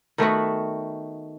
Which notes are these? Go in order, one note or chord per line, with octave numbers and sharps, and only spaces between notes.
D#3 A3 B3 F#4